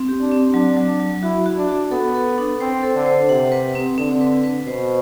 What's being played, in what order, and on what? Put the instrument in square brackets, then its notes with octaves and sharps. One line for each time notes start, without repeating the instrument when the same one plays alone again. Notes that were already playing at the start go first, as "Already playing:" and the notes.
Already playing: [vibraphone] C4
G4
[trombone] D4
[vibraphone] C4
[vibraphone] F#3 [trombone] D4
[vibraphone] F#3
F#3
[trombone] E4 [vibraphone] F#4
[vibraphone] F#4
[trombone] D4
[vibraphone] F#4
[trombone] B3 [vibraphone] A4
[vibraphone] A4
D4
[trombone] C4 [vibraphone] C5
[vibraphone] A4
[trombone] D3
[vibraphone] C5
[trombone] C3 [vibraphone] F#5
[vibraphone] B4
C4
[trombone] D3 [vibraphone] C4
[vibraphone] B4
B4
[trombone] B2 [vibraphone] C5